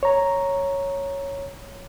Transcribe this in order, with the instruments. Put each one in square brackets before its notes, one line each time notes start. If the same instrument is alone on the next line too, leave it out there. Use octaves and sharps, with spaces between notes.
[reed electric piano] C#5 A#5